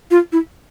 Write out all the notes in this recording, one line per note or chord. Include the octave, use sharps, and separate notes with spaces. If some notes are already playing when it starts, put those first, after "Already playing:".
F4
E4